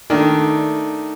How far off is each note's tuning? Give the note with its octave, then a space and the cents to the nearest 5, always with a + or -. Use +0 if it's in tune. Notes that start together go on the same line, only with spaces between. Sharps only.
D#3 +0 A3 +0 D4 +0